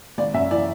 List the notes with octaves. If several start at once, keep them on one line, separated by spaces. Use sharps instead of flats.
G#1 D5
F#2 E5
E3 D5